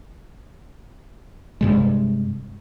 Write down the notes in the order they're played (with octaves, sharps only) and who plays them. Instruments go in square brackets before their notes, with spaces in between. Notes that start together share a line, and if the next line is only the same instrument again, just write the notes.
[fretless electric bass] G2 C3 G#3